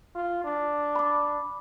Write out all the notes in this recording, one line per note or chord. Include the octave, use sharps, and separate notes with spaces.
F4
D4
B5 D6